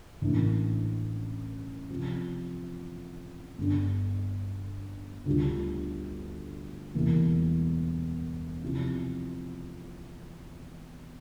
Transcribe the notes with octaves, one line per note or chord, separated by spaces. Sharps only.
A1 A2 E3 A#3 D4
C3 F3 C4
G1 G2 D3
D2 D3 G3 D4 F4
E1 E2 E3 G3 A#3
C3 F3 C4 E4